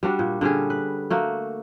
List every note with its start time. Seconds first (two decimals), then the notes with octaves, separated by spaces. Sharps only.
0.03 G3 D4 F#4
0.19 A#2
0.41 D3 G3 C#4 G#4
0.70 B4
1.10 A3 A#3 F#4